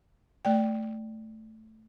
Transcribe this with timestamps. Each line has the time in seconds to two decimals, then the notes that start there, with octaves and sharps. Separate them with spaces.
0.45 A3 D5 G5